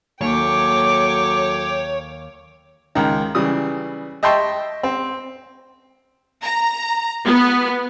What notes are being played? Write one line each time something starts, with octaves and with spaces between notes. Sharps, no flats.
D#2 F#3 A4 C#5 G5 D6
C#2 D#3
C#3 E3 G3 D#6
D#5 E5 G5 A5 C6 C#6
C4
A#5
B3